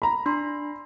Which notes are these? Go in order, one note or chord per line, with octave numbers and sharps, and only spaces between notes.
A#5 B5
D4 C6